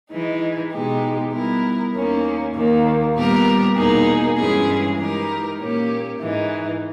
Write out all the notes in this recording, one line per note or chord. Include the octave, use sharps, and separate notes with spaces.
E3 G#3 D#4
B2 G#3 D#4 G4
G3 B3 E4 A#4
D#2 D#3 A#3 C#4
D#2 D#3 A#3
A#2 G3 B3 G4 A#4
E2 B2 A#3 D#4 G#4
G2 E3 G#3 C#4 G#4
E3 G#3 D#4 G4 A#4
A#2 A#3 C#4 G4
G#2 E3 G#3 D#4